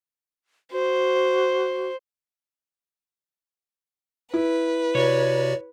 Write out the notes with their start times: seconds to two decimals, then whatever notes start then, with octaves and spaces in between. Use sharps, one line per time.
0.72 F#4 C5
4.34 E4 B4
4.95 C3 F#4 C#5 D5